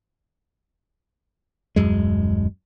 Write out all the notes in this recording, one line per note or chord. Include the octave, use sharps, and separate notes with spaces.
D#1 G#1 F#2 G#3